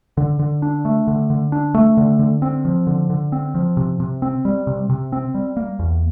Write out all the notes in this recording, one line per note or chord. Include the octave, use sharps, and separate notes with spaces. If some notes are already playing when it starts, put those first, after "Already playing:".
D3
D3
D4
A3
D3
D3
D4
A3
D3
D3
C4
F3
D3
D3
C4
F3
C3
C3
C4
G3
C3
C3
C4
G3
A#3
E2